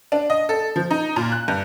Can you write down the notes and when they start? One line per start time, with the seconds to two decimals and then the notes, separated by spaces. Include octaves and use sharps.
0.12 D4
0.30 D#5
0.49 A4
0.76 F3
0.91 D#4
1.16 A#2
1.32 F#6
1.48 G2